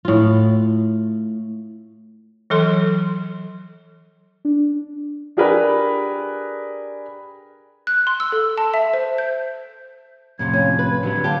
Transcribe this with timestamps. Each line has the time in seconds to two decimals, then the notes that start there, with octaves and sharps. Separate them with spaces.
0.05 A2 F4
2.50 E3 F#3 A4 C6
4.45 D4
5.37 D4 G4 G#4 A#4 B4 D5
7.87 F#6
8.07 C6
8.20 E6
8.32 A4
8.58 A5
8.74 E5
8.94 C5
9.18 G6
10.39 F2 A2 C3 G#6
10.53 C#4 F4
10.79 B4
11.03 D3 F#3 G3
11.24 F4 G4 A5